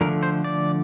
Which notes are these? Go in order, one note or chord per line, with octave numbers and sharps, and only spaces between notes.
D3 F3 A3 A#4
C5
D5